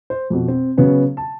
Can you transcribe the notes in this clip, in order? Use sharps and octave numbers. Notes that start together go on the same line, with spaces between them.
C5
F2 B2
C4
C#3 F#3 B3 C#4
A5